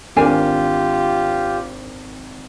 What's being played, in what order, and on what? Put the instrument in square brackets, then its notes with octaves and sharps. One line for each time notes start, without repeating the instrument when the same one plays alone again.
[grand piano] G#1 [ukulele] D4 A#4 G#5 [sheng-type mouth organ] F4 G4